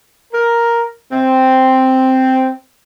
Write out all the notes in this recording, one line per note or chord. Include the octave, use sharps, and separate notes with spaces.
A#4
C4